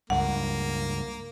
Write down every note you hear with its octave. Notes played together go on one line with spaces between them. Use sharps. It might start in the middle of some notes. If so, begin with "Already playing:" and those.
C#2 G2 A#3 F#5